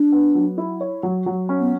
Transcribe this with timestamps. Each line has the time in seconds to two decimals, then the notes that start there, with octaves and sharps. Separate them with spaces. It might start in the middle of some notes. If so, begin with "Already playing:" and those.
Already playing: D4
0.12 B3
0.35 F#3
0.58 E4
0.81 C#5
1.03 F#3
1.26 F#3
1.49 C#4
1.60 B3